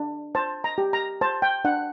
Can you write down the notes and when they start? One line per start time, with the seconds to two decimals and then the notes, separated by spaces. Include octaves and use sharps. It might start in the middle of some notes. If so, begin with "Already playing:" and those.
Already playing: D4
0.35 C5 A5
0.64 A#5
0.78 G4
0.93 A#5
1.21 C5 A5
1.42 G5
1.65 D4 F#5